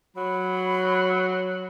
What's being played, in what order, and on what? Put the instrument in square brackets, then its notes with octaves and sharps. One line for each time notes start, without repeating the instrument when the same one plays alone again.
[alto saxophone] F#3 [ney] B5